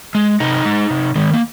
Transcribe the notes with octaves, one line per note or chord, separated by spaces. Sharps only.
G#3
C3 D#4
G#3
C3
D#3 G#3
A#3